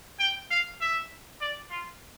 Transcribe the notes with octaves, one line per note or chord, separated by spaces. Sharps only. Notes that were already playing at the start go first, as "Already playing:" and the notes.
G5
F5
E5
D5
F4